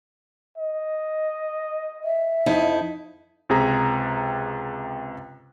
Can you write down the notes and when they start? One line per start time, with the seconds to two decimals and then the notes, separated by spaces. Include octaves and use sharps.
0.58 D#5
2.04 E5
2.46 F2 D#4 E4
3.49 C#2 C3 G#4 A#5